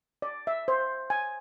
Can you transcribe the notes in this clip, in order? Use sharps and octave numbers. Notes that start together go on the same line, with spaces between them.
D5
E5
C5
G#5